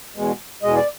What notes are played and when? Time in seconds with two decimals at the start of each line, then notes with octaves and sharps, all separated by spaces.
0.15 E2 B2 G#3
0.63 E2 B2 G#3 D#5
0.75 D5